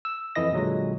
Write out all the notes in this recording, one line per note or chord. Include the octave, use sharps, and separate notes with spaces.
E6
F2 E3 E4 D#5 A#6
A#2 D3 F#3 G#3